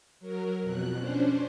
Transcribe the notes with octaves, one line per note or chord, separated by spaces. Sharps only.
F#3 A#4
F2 B2 F#6
C#4 D4 C5